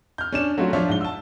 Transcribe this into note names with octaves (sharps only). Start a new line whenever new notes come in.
F6 G6
C#4 D4 E7
F#3 A3 C4 C#4 F4 F#4
F3 D4 F4 C#5 E5
G#2 G7
A5 E6